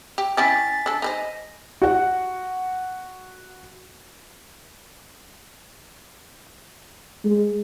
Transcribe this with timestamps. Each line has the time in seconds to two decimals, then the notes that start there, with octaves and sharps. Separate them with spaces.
0.18 G4
0.37 C#4 E4 G4 G#5 A6 B6
0.86 D4 A4
1.02 D#4 B4 C5 D#5
1.82 F#4 F#5
7.25 G#3